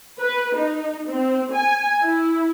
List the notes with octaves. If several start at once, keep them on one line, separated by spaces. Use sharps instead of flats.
B4
D#4
C4
G#5
E4